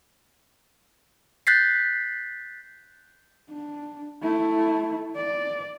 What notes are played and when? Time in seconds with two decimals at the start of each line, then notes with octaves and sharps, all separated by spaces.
1.47 F#6 G6 A6 B6 C7
3.50 D4
4.22 A3 E4
5.16 D5